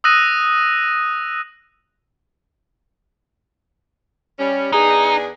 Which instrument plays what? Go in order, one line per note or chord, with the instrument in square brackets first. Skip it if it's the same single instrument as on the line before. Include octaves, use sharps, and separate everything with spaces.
[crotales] D#6 E6 F#6 A#6 D#7
[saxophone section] G3 C#4
[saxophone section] E2 D4 G#4 [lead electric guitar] D#4